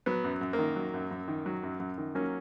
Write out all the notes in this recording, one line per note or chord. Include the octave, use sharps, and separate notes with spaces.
F#3 B3
F#2
F#2
A#3
D#3
F#3
F#2
F#2
D#3
F#3
F#2
F#2
D#3
F#3 A#3 C#4